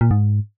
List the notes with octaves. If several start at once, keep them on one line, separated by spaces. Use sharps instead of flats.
A#2
G#2